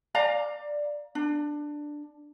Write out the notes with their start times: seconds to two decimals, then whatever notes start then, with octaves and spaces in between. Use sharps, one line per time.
0.15 D5 F5 A#5
1.15 D4